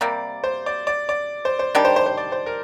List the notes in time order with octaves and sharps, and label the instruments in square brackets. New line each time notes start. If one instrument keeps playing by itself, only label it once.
[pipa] C3 G3 A#3 [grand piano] D5
[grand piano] C5
D5
D5
D5
C5
C5
[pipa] D#3 G3 D4 G4
[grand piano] C5
C5
C5
D5
C5
A#4